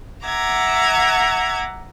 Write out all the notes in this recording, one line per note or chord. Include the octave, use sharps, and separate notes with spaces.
E5 F#5 A#5 D6 G#6